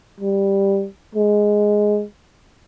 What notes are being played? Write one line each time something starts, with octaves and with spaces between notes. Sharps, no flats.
G3
G#3